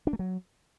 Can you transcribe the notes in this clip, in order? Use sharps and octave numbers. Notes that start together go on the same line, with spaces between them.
D4
A3
F#3